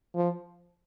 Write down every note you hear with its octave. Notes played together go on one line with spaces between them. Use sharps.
F3